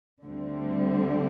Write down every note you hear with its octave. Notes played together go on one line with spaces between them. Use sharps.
D2 D3 G3 C4